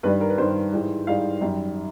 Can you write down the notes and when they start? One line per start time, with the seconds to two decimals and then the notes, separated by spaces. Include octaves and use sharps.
0.03 G2 D#3 G3 B4
0.21 A#4
0.30 B4
0.38 G2 D#3 G3 C5
0.73 G#2 E3 G3
1.07 G#2 E3 G3 F5
1.41 F#2 D#3 G3